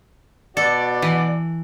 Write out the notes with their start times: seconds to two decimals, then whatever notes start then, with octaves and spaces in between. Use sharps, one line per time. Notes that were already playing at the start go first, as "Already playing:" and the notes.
0.57 B2 F#4 A4 D5
1.02 E3